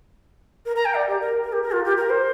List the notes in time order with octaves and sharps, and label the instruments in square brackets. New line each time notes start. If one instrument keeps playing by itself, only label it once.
[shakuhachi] A#4
A#5
G5
D5
G4
A#4
A#4
G4
A#4
F4
G4
A#4
C5